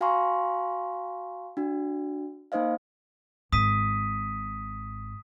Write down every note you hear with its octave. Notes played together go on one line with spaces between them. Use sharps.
F#4 F5 G#5 A#5 C6 C#6
D4 F#4
A#3 D#4 C5 D#5 F5
G#1 D#6 B6 D#7